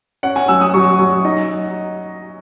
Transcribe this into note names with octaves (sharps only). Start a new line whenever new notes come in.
C#4 F#5
G#5
F#3 E6
D#6
F#3 C#6
F#3
D#4 D#5